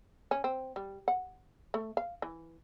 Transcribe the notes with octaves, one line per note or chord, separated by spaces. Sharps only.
C#4
C4
G3
F#5
A3
F5
E3